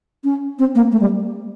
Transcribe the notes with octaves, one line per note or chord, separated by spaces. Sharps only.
C#4
C4
A#3
A3
G3